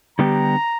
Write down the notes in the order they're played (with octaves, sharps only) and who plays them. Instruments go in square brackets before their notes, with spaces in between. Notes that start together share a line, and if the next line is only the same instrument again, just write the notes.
[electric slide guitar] D3 G3 B3 D4 G4 [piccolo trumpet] A#5